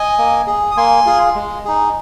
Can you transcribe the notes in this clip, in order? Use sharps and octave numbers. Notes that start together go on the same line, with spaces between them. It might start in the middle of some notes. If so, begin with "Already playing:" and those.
Already playing: D#5 G#5
A#3
G#4
D#6
A#3 G#5 C6
F4 G#4
G#3
D#4 G#4